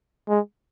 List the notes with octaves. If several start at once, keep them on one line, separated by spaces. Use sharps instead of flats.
G#3